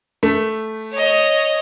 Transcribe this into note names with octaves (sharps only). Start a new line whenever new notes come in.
A3
C#5 D#5